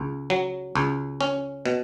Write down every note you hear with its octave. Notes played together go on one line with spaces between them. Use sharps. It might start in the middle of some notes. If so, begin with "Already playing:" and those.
Already playing: C#2
F#3
C#2
C#4
B2